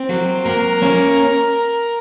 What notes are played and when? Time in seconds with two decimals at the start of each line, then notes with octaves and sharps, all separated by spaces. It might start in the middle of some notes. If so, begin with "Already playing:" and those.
Already playing: C4
0.09 F#3 A#3
0.45 F#3 A#3 A#4
0.82 A#3 C#4